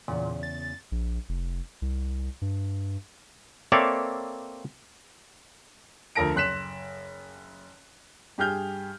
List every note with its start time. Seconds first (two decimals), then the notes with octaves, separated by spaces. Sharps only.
0.08 E2 A#2 C#3
0.43 A6
0.92 A#1
1.29 F1
1.82 C2
2.42 G2
3.72 A#3 C4 A4 C#5 D5 E5
6.15 D2 F3 A#4 A5 A#6 D7
6.35 F#1 C6 F#6 B6 E7
8.38 G2 G4 G#4 F6 G6